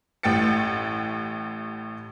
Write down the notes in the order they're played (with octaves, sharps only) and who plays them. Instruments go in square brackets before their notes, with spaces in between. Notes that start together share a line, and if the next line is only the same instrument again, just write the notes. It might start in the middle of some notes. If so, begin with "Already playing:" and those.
[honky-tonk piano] A1 A2 G5 A6 C#7